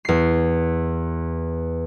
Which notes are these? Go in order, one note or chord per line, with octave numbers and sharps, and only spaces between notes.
E2 C7